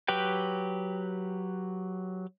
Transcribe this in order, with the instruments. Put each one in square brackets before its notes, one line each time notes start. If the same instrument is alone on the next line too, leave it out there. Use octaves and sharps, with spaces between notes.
[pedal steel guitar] F#3 G4 B4 G5